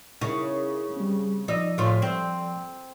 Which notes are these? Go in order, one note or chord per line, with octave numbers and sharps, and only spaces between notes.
C#3 D#4 E4 A#4
G3 C4
F3 D#4 D5 E6
A2 F4
C4